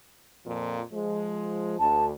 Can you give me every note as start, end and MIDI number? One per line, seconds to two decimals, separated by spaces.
0.46 0.80 41
0.46 0.80 46
0.46 0.80 53
0.93 1.78 53
0.93 1.78 56
1.80 2.11 38
1.80 2.05 81